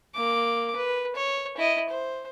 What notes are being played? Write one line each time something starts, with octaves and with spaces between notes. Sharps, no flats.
A#3 D6
B4
C#5
E4 D#5
C5